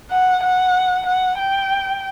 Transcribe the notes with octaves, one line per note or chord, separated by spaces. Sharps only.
F#5
F#5
F#5
G5